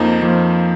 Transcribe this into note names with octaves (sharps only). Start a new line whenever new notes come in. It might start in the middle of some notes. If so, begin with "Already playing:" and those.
Already playing: F2 F3 A#3 D#4
F2 F3 A#3